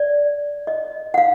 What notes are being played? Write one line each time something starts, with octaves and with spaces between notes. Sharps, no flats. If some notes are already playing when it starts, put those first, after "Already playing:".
Already playing: D5
D#5
F#5
F5